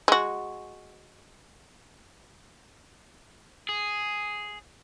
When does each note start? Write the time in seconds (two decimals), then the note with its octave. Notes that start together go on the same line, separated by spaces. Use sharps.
0.08 G#3 F#4
3.69 G#4